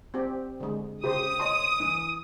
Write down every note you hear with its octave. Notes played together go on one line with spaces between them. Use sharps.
C4 G4
D3 G#3
C#3 G4 C5 D#6
C#5 D#5 C6
E3